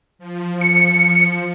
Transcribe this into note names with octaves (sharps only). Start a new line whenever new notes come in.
F3
C#7